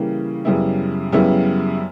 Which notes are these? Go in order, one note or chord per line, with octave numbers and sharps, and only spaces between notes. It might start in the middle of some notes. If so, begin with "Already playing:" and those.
Already playing: C#3 E3 G3 A#3
F#2 C#3 G3 B3 E4
F#2 C#3 G3 B3 E4